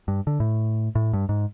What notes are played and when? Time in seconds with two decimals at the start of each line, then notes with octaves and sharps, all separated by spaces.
0.08 G2
0.27 D3
0.40 A2
0.95 A2
1.13 G2
1.29 G#2